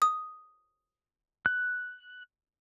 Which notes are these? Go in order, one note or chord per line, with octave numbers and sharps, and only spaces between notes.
D#6
F#6